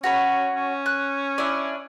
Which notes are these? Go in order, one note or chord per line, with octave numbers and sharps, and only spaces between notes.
C#4 F#4 C#5 B5
C#4
F#6
D4 E4 D5